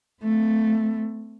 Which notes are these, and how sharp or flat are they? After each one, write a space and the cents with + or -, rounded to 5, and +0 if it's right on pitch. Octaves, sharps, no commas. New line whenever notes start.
A3 +0 C4 -30